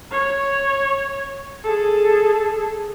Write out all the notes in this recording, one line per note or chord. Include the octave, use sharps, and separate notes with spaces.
C#5
G#4 A4